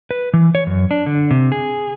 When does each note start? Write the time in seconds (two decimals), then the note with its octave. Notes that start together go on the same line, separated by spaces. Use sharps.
0.11 B4
0.34 E3
0.55 C#5
0.67 F#2
0.91 D4
1.06 D3
1.31 C3
1.52 G#4